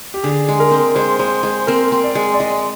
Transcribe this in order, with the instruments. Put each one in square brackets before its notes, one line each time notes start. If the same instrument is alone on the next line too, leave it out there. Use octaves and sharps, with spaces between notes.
[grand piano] G4
[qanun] D3 [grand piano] G#4
[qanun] G#3
[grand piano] A#4
[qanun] C4
[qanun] G#3 [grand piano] C5
[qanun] G#3 [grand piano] C5
[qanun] G#3 [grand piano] C5
[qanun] C4 [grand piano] A#4
[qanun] C4
[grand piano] D5
[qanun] G#3
[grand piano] D5
[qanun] G#3 [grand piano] D#5